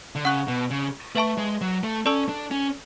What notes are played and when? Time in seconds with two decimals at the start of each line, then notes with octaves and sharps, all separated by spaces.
0.15 D3
0.25 C#3 F#5 C#6 F#6
0.48 B2
0.70 C#3
1.15 A3 B4 E5 A5 C#6
1.38 G#3
1.61 F#3
1.84 A3
2.06 C#4 A4 D5 A5 C#6 E6
2.29 D4
2.51 C#4